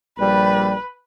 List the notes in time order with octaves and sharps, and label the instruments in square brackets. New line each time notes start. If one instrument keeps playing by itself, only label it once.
[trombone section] A#1 G3 [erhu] B4